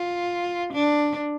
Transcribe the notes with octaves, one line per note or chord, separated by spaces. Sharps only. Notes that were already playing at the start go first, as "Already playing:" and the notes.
Already playing: F4
D4